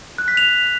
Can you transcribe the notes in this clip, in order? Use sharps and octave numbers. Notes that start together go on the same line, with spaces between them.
F#6
B6
F7